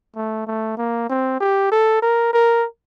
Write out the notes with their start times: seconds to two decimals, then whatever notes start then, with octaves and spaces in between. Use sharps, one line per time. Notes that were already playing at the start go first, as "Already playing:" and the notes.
0.16 A3
0.47 A3
0.77 A#3
1.10 C4
1.40 G4
1.72 A4
2.02 A#4
2.33 A#4